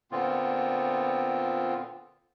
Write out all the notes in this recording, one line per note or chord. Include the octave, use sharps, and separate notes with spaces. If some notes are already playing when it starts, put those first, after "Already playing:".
A#2 D3 B3 C4 F4